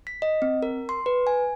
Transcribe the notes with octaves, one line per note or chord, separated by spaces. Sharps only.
B6
D#5
C4
A#4
C6
B4
G#5